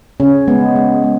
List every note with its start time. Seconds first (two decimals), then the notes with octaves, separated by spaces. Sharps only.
0.20 C#3 C#4
0.48 G#3 B3
0.76 G#3
1.04 G#3